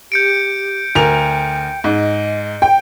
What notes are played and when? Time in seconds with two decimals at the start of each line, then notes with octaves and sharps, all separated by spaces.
0.12 G4 G6 C#7 D7
0.95 D2 A#4 G5 F7
1.84 G#2 D#5
2.62 G5